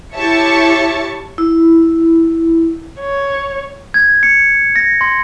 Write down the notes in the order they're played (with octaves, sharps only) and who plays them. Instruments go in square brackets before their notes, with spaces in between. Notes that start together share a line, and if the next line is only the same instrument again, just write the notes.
[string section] E4 G4 C#5 E5 A5 C#6
[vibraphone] E4
[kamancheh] C#5
[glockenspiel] G#6
C#7
A#6
C6